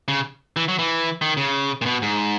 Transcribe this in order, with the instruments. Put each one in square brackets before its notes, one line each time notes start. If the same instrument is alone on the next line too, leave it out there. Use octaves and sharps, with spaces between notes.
[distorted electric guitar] C#3
E3
F#3
E3
D#3
C#3
A#2
B2
G#2